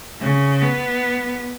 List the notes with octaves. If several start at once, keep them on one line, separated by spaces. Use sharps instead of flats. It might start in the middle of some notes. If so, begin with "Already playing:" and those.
C#3
B3